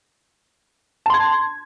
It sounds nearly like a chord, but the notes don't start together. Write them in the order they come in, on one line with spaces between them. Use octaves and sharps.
A5 C6 G#6